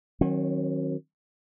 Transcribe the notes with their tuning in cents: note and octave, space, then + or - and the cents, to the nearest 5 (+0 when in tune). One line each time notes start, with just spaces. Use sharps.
D#3 +0 F#3 +0 C#4 -45